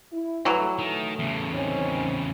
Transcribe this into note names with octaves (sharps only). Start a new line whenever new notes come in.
E4
G2 E3 F#3 A3
D#3 A3
E2 C#3
D#3 C4 C#4